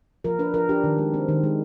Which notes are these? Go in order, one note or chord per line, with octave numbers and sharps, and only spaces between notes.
F3 A#4
D4 B4
F3 A#4
D4 G4
D#3
G#3
C4
D#3
G#3